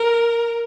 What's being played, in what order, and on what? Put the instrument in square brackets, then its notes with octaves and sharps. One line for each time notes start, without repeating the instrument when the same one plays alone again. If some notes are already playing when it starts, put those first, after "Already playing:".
Already playing: [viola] A#4